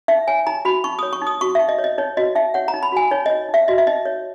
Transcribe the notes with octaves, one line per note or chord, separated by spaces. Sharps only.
D#4 E5
C#5 G#5
D#4 A#5
F#4 B5
D#4 C#6
C#5 D#6
C#6
D#4
D#6
F#4 C#6
D#4 E5
D#5
C#5
D#5
D#4 C#5
F#4 D#5
D#4 E5
C#5 F#5
A#5
D#4
B5
F#4 G#5
D#4 C#5
C#5 D#5
D#4
E5
F#4 D#5
E5
D#4 D#5
C#5